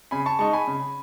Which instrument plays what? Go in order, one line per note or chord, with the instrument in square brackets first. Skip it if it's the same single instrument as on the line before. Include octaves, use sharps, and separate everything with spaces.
[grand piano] C#3 G#5 B5
A5 C#6
G#3 D#4 A5 C#6
G#5 B5
C#3